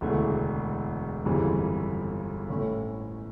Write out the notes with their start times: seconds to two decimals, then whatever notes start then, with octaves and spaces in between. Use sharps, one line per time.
0.01 E1 D2 C#3 E3 A3
1.25 G1 F2 C#3 E3 G3
2.49 A1 A2 E3 A3 C#4